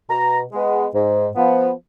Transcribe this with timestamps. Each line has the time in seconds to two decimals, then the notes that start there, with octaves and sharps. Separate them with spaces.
0.09 B2 A#5
0.52 G#3 B3
0.94 G#2
1.36 F3 B3